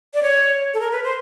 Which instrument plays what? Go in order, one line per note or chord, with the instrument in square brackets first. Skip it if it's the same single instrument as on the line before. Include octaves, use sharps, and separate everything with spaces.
[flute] D5
C#5
A4
A#4
B4
C5